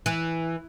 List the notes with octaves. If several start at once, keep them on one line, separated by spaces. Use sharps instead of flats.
E3